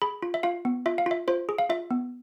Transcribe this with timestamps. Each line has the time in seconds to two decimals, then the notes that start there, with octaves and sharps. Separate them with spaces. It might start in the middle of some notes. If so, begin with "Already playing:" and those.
0.02 G#4 B5
0.22 F4
0.34 E5
0.43 F4 F5
0.65 B3
0.86 F4 E5
0.98 F5
1.06 F4 E5
1.28 F4 C5
1.49 G#4
1.58 F5
1.69 F4 E5
1.91 B3